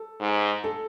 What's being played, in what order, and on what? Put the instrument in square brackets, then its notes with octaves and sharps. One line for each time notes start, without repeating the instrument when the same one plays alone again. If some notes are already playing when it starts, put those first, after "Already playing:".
Already playing: [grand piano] A4
[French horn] G#2
[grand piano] A4